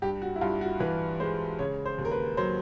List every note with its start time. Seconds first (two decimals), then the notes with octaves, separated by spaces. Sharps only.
0.02 G2 G4
0.22 F#4
0.36 E4
0.41 G2 F4
0.61 F#4
0.80 E3 B4
1.20 G#3 C5
1.59 C#3 C#5
1.86 C5
1.98 D#2
2.05 A#4
2.12 B4
2.37 F#3 C5